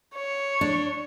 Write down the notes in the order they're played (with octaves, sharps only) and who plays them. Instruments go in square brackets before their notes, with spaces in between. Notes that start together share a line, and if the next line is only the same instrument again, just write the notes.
[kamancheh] C#5
[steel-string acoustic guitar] D4